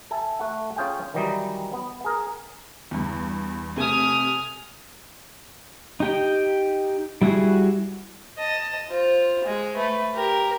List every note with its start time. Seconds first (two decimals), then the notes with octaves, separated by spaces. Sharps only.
0.11 A4 E5 G#5
0.39 A3 F#5
0.76 C#4 F4 G#4 G5 G#5
1.14 D#3 E3 F#3 G3 D#4
1.73 B3
2.04 G#4 A#4
2.91 E2 G2
3.76 C3 A3 G#5 D#6 F6
6.00 D#4 G4 G5
7.22 G3 E4 F#4 G#4
8.38 D#5 A5
8.89 F4 C5
9.44 G#3
9.75 A3 B4
10.13 G4 A#4